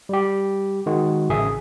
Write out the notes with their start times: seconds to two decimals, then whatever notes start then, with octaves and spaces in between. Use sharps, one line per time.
0.09 G3 G4
0.86 D#3 G#3 F#4
1.29 A1 C#3 G#4 E5